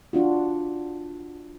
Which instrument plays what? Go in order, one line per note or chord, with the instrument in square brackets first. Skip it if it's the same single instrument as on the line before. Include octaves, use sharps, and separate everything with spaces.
[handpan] D4 F4 F#4